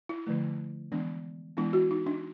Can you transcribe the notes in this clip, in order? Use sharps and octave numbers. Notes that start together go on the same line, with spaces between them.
E4
D3 F3 A3
E3 G#3 B3 D4
E3 G#3 B3 D4 E4
F#4
D#4
D4